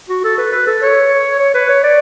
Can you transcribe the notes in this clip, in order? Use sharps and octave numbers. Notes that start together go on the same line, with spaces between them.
F#4
A4
B4
B4
A4
C#5
C#5
B4
C#5
D5